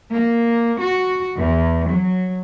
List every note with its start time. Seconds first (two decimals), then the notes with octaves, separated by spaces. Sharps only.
0.11 A#3
0.79 F#4
1.37 E2
1.88 F#3